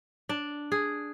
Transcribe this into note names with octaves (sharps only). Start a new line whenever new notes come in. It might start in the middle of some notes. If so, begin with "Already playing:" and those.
D4
G#4